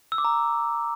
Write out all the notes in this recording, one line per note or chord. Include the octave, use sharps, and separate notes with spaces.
E6
D6
A#5